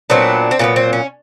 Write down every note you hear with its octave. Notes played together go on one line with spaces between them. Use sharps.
A#2 F#3 B3 C4 D4
C4
A#2 F#3 B3 C#4
C4
C#4